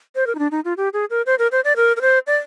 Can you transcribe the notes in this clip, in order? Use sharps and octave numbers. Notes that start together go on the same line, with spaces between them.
C5
A#4
D#4
D4
D#4
F4
G4
G#4
A#4
C5
A#4
C5
D5
A#4
A#4
C5
D5